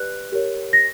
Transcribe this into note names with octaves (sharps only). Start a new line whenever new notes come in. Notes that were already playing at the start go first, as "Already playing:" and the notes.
Already playing: G4 B4 D5 F#6
G4 A#4 C#5
A#6